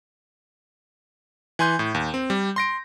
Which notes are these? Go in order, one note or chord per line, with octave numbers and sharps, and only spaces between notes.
E3 G#5 C6 G6
A2
D#2
C4
G3
C6 A#6 D7